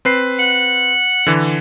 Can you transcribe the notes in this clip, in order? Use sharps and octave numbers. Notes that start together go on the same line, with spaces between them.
C4 B4 C7
F#5
D3 E3